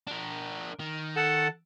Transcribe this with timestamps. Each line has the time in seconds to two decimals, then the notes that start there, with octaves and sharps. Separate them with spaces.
0.07 D4 A#4
0.79 D#3
1.16 A4 F#5 A5